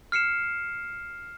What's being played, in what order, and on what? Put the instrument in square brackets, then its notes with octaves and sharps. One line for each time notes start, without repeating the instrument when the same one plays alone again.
[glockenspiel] F6 C7 C#7 E7